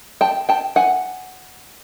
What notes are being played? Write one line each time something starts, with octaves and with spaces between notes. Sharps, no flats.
G5 A5
G5 A5
F#5 G#5